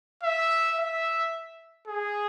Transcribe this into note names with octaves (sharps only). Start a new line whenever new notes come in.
E5
E5
G#4